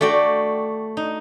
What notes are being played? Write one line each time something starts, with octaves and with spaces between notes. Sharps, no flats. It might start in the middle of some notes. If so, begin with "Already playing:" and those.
A3 F#4 D5 G5
D#4